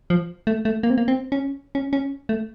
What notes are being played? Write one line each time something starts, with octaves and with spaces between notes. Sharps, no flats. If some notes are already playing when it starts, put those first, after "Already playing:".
F3
A3
A3
A#3
C4
A#3
C4
C#4
C#4
C#4
A3